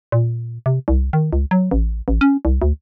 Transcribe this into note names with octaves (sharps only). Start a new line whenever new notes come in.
A#2
C3
C2
D#3
C#2
F#3
A1
A1
C#4
C2
D2